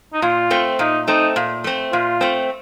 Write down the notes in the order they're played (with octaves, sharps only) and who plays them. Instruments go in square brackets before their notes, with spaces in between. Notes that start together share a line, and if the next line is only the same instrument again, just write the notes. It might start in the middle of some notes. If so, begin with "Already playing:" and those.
[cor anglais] D#4
[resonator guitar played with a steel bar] A#2 [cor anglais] F4
[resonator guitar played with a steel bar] A3 C4
[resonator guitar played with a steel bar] A#2 [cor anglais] D#4
[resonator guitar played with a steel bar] A3 C4 [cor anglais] D#4
[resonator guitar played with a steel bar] A#2
A3 C4
[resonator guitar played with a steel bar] A#2 [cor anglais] F4
[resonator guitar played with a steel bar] A3 C4